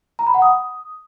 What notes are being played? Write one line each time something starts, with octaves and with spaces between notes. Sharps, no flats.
A#5
B5
F#5
D#6